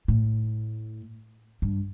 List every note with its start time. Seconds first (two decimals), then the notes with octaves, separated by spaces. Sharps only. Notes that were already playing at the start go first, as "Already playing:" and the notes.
0.08 A2
1.62 G2